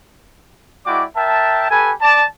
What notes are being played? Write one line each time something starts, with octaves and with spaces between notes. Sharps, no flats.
G#3 E4 F#4 D5 G5 D6
A#4 E5 G5 A5
G4 A4 B4 G#5
D5 A5